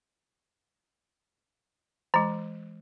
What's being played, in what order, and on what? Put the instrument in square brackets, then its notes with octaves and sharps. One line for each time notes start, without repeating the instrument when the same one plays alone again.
[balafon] E3 G#3 [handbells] A#5